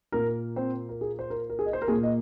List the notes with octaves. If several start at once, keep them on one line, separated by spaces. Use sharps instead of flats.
A#2 A#3 A#4
C4 C5
A#4
G#4
C5
A#4
A#4
G#4
D#5
C5
A#4
A#2 A#3 G#4
D#5